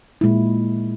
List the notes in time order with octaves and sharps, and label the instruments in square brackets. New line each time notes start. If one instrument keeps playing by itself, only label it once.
[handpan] A#2 G#3 E4